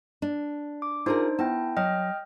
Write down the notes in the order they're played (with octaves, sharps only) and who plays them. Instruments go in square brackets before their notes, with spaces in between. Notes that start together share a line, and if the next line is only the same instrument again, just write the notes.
[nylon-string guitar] D4
[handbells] D6
[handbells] D4 D#4 C5 [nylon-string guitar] F4 G#4 A#4
[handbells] B3 E4 G5 [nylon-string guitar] A5
[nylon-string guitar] F#3 [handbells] D#5 G5 F6